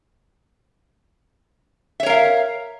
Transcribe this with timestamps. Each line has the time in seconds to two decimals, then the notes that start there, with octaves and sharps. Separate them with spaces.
2.00 E5
2.03 C#5
2.06 A#4
2.10 F5